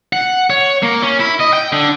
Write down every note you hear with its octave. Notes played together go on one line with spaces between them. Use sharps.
F#5
C#5
A#3
C#4
E4
D#5
G5
D3